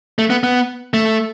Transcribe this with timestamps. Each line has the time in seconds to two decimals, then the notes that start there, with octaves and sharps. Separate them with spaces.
0.19 A3
0.30 B3
0.43 B3
0.94 A3